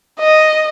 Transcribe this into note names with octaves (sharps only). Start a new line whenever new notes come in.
D#5